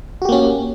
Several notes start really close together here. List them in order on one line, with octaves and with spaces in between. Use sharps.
F#4 G4 A#3 C#4